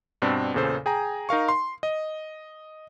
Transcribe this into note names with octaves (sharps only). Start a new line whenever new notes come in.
G2 B2 C4 D4
E2 A#2 C#3 A4 C5
G#4 G5 G#5 A#5
D#4 A#4 F5 C#6
C6
D#5